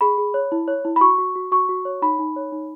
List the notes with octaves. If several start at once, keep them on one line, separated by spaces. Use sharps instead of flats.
G#4 B5
G#4
C#5
E4
C#5
E4
B5
F#4 C#6
F#4
F#4
F#4 C#6
F#4
C#5
D#4 B5
D#4
C#5
D#4